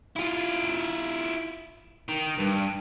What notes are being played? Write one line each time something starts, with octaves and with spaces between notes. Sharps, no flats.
E4 F4
D#3
G2